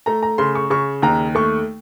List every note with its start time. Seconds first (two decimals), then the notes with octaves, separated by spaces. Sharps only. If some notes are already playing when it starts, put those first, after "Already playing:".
0.06 A3 A#5
0.23 A#5
0.38 C#3 C6
0.55 C#6
0.70 C#3 C#6
1.02 D#2 A#5
1.35 A3 C#6